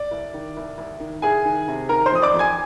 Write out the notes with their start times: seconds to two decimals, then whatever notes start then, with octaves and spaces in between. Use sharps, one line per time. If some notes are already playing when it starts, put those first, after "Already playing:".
Already playing: D5
0.11 C2
0.34 D#3
0.57 C2
0.78 C2
1.00 D#3
1.22 C2 G#4 G#5
1.45 D#3
1.68 C3
1.89 D#3 A#4 A#5
2.06 C5 C6
2.12 F2 D#6
2.22 D5 D6
2.34 F2
2.39 G#5 G#6